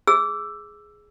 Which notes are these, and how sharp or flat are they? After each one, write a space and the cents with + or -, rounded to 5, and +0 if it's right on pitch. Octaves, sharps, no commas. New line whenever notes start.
G#4 +5 E6 +10